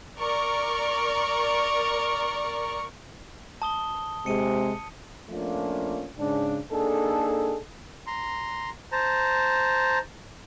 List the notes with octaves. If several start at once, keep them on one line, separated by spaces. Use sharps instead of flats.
A#4 D5 C#6
A5 D#6 G7
C3 G#3 C#7 D#7
F3 A3 A#3 C#4 D4 F4
G#2 C#3 D4
A#3 D4 D#4 G#4 A4
A#5 C6
C5 A5 A#5